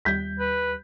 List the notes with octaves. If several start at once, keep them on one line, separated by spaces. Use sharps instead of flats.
D#2 G3 G6 B6
B4